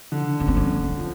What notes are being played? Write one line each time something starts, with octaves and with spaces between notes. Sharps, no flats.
D3
C#4
C4
C#4
F3